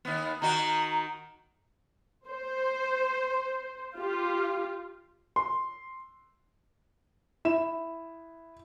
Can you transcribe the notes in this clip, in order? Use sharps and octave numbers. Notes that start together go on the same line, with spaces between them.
D#2 B3
D#3 D#4 F#4 A#5
C5
F4 G4
C6
E4 E7